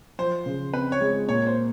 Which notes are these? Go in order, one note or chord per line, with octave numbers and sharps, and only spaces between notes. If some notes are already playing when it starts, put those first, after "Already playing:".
F3 C5
C#3
C4 B4
C#5
G#3
A#2 C#5
C5